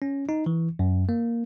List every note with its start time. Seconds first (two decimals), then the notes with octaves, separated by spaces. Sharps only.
0.02 C#4
0.29 D#4
0.46 E3
0.79 F#2
1.09 A#3